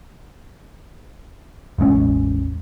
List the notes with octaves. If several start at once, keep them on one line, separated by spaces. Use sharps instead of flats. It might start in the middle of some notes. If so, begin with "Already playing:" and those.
E1 A1 G#3 C#4